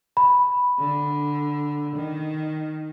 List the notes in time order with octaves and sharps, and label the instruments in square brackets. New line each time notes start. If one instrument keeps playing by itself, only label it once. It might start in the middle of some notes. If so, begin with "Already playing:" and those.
[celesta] B5
[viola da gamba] D3
D#3